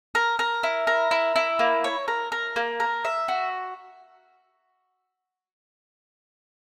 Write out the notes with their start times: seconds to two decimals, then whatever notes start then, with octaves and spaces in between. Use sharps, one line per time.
0.15 A#4
0.39 A#4
0.63 E4
0.87 A#4
1.11 E4
1.36 E4
1.59 A#3
1.84 C#5
2.08 A#4
2.32 A#4
2.56 A#3
2.80 A#4
3.05 E5
3.28 F#4